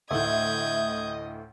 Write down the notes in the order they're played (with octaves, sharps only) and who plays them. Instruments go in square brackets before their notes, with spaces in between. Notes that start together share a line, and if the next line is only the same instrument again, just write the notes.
[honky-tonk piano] D2 A2 [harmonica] D#5 D#6 [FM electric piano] E5 [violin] G6 G#6